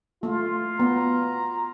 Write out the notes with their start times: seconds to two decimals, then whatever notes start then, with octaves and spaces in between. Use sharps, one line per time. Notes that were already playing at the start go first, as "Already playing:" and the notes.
0.23 A3 F4
0.80 B3 A#5